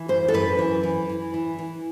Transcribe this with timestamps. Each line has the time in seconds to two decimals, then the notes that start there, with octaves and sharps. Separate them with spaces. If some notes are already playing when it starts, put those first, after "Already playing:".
Already playing: E3
0.08 F#2 C5
0.28 A4
0.34 F#2 B4
0.59 E3
0.83 E3
1.09 E3
1.34 E3
1.58 E3